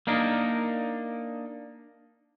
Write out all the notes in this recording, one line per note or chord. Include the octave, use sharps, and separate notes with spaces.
A#3 D4 D#4 A#4